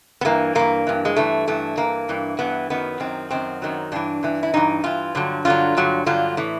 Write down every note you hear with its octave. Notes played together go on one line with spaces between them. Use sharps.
B3
G2 E3 A#3
G2 E3 A#3
G2 E3
G#3
G2 E3 A3
G2 E3 A3
G2 E3 A#3
G2 E3
G2 E3 B3
F#2 D#3 F#3 B3
F#2 D#3 F#3 C4
F#2 D#3 F#3 C4
F#2 D#3 F#3
G2 E3 D4
G2 E3
E4
G2 E3 D#4
G2 E3 F4
G2 D3 F#3
G2 D3 F#3 F4
G2 D3 F#3
G2 D3 F#3 F4
A2 E3